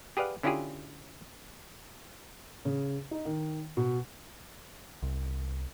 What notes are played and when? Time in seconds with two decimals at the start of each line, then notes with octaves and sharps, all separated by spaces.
0.17 G4 G#4 B4 D5 F5 F#5
0.43 D3 C#4 E4 F4 G4 G#4
2.65 C#3
3.11 D#4
3.25 D#3
3.77 B2
5.02 C2